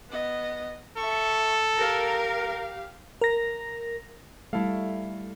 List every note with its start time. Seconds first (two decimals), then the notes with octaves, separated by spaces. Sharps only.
0.10 B3 D#5
0.97 A4 E5 C#6
1.78 G4 A#4 F5
3.21 A#4 A#6
4.53 G3 A3 E4 A4 F5